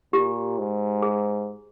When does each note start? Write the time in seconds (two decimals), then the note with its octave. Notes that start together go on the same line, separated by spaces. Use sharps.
0.13 A#2 G4
0.58 G#2
1.02 G#4